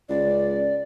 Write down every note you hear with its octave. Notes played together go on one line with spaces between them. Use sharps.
C#2 D5